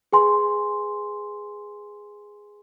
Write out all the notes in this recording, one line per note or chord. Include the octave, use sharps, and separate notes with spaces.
G#4 B4 G#5 C6